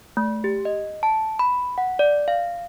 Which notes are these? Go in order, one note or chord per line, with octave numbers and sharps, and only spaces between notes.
A3
G4
D#5
A5
B5
F#5
D5
F5